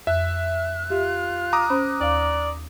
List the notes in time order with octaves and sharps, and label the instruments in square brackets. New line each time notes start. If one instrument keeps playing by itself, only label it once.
[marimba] F2 [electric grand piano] E5 [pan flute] F#6
[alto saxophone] F4 [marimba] G4
[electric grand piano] A#5 D6 D#6
[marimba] C#4 C5 B5
[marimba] D#2 F5 [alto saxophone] D5